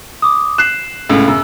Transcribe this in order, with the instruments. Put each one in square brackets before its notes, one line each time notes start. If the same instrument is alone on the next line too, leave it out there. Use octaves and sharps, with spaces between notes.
[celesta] D6 D#6
[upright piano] F#6 [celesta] C7 E7
[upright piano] C#2 A2 C#3
F#2 C#3